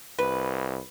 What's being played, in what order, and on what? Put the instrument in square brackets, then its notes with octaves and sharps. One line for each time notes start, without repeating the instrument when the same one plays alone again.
[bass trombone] C2 [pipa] B4